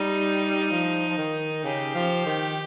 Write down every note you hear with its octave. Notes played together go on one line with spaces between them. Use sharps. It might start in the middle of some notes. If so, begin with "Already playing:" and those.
Already playing: G3 D#4
F3
F3
D#3
C#3 G4
F3
D#3